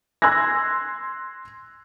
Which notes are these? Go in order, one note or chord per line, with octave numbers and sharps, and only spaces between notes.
C6 E6 F#6 G#6 A#6